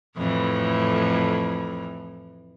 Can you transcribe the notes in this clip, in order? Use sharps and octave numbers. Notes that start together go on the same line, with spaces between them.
F2 A2 E3